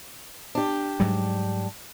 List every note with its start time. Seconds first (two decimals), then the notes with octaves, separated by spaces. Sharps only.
0.55 D4 G4
1.00 G#2 F#3 G3